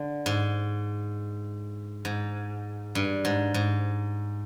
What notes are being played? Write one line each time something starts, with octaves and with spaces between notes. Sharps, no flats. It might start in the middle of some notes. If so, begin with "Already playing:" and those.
Already playing: D3
G#2
G#2
G2
G#2
G#2